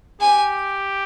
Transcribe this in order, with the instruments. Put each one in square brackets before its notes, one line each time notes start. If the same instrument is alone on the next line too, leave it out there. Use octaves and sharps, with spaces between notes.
[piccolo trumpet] G4 [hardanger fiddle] G#5